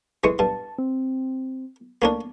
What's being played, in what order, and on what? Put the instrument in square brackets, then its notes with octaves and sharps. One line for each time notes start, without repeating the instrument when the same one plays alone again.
[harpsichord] E3 G#3 C#6
[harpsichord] G2 [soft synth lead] A5
[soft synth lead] C4
[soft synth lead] A3 [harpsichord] A#3 C#4 D4